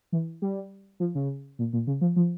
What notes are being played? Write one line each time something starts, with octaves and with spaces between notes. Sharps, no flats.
E3
G3
F3
C#3
A#2
A#2
C#3
F3
F3